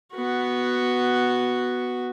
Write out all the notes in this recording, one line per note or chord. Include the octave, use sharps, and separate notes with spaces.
B3 F#4